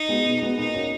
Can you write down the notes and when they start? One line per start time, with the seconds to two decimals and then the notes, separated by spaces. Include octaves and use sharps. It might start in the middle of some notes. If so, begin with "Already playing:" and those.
Already playing: D#4
0.09 G#3 B3 F#4
0.25 B2
0.41 G#3 B3 F#4
0.58 A#2 D#4
0.74 A#3 C#4 F#4